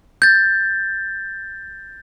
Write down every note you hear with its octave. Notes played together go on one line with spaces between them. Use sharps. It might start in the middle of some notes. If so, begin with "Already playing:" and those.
G6 A6